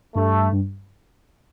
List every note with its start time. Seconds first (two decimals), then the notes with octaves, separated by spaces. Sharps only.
0.15 G2 A3
0.52 G2